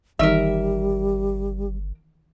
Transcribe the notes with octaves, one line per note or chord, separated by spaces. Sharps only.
G1 D#3 E3 G3 D#4 A#4 E5